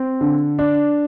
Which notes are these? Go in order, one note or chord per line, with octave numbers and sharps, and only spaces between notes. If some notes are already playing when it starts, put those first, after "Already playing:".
Already playing: C4
D3
D4